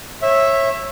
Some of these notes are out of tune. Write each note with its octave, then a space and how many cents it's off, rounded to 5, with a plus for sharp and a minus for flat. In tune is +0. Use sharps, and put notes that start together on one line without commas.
C#5 -25 E5 +0